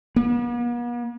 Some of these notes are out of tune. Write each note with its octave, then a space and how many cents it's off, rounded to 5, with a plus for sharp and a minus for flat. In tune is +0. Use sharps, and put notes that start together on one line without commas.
B3 -45